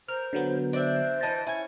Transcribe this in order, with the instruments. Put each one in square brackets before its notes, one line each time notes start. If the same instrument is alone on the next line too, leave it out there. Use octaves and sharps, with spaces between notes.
[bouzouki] A#4 [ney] C5 [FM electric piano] F6
[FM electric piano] D3 F#3 B3
[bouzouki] D4 E5 [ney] C5
[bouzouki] E3 D#5 A5
[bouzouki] C#4 [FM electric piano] E4 G#5 G#6